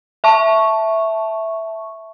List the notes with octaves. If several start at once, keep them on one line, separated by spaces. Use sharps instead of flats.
E5 A5 C#6